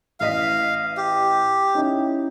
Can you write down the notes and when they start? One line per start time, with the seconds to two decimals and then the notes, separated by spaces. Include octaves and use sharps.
0.20 A1 D#5 F5 B6
0.97 G4
1.75 C#4 D#4 E4